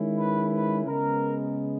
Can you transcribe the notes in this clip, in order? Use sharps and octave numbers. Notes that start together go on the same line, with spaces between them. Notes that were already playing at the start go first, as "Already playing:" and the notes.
Already playing: D#3 G#3 C#4 E4
B4
B4
C#3 G#3 B3 A#4